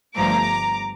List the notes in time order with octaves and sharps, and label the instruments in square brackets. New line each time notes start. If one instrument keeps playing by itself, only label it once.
[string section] G1 G2 F3 A3 A#5 D6